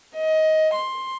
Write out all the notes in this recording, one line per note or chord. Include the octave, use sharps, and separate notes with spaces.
D#5
C6